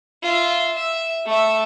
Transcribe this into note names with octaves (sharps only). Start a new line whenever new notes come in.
F4 E5
E5
A3 E5